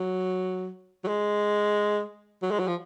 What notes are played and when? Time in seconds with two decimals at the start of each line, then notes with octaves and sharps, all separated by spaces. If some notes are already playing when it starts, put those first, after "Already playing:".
Already playing: F#3
1.04 F#3
1.08 G#3
2.43 F#3
2.51 G#3
2.59 F#3
2.68 F3